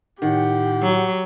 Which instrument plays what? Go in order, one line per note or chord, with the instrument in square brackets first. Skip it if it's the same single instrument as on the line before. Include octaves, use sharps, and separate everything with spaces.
[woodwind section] A2 F#5 [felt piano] D#3 [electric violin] G4
[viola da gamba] F#3